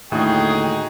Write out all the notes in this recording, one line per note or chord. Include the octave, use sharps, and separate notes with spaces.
D#2 A2 D3 D#4 F#4 G#4 G5